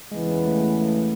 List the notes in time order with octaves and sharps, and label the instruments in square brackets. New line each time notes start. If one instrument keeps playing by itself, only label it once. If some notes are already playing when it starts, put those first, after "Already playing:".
[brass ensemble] E2 C#3 E3 B3 [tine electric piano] G#3
[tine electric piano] A3
A3